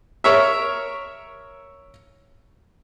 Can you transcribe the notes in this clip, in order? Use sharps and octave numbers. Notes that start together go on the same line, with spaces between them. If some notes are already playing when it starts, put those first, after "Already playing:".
A#4 C#5 E5